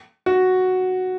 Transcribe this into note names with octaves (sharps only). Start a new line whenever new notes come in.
F#4